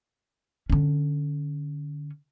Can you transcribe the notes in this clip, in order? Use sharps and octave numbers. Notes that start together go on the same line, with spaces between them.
D3 C#4